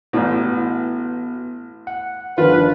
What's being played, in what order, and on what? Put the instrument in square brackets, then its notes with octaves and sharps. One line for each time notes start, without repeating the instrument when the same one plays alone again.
[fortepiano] A1 A2 [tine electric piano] B3 F#4
[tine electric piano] F#5
[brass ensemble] G1 B4 [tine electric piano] D#3 F3 D4 [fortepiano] F4